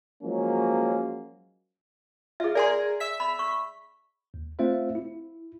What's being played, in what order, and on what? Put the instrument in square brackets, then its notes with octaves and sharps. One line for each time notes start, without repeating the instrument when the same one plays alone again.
[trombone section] F3 F#3 G#3 A#3 C#4
[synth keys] F4 [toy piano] G#4 E5
[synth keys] G#4 A#4 [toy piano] D5 G#5 C6
[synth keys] E5 B6
[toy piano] B5
C#6
[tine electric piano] D#2
A3 C4 F4 C5 E5 F5
E4